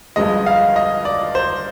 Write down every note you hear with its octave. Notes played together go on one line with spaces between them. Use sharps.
G1 G2 F3 G#3 D#5
F5
D#5
D5
C5